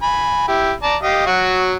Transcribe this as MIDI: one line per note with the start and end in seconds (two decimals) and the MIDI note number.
0.02 0.45 80
0.02 0.45 83
0.48 0.72 64
0.48 0.72 67
0.83 0.96 74
0.83 0.96 81
0.83 0.96 82
1.03 1.26 67
1.03 1.26 75
1.03 1.26 77
1.26 1.75 54
1.26 1.75 66